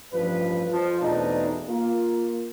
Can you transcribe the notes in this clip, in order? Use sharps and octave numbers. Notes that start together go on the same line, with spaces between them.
A1 G2 F3 B4
F2 F3
E2 B2 A3 C4 D4 D#4
A#3 F4